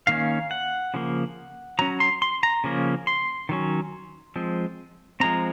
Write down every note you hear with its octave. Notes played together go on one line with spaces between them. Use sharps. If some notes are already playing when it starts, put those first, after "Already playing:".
D#3 A#3 C#4 F5
F#5
C#3 F3 A#3
F#3 C#4 A#5
C6
C6
A#5
C#3 F3 A#3 C#4
C6
D#3 F#3 C#4
F3 G#3 C4
F3 G#3 C4 A#5